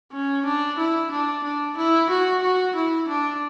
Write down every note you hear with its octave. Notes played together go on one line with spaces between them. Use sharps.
C#4
D4
E4
D4
D4
E4
F#4
F#4
E4
D4